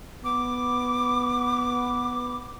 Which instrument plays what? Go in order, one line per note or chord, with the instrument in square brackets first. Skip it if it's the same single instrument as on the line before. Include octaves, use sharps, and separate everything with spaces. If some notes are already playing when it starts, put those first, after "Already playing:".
[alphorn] B3 [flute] D6